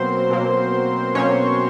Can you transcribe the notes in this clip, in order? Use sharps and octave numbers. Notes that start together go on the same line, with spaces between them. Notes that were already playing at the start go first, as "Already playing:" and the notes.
Already playing: B2 F#3 A#3 C4 C5
B2 F#3 A#3
B2 F#3 A#3 C#4 C#5